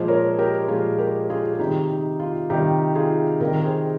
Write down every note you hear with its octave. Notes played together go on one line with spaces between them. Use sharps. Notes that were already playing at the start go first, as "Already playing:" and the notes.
Already playing: A#2 F3 G#3 C5 D#5
A#4 C#5
G4 A#4
A#2 F3 G#3 F4 G#4
G4 A#4
F4 G#4
G#4
C3 D#3 G3 D#4 G4
D#4
F4
C3 D#3 G3 D#4 G4
F4 G#4
C3 D#3 G3 G4 A#4
G#4 C5